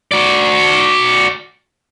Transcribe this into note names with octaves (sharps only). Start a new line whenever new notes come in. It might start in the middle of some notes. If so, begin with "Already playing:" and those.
F#4 D5